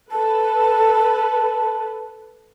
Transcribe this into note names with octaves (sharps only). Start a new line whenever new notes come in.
A4 B4 A5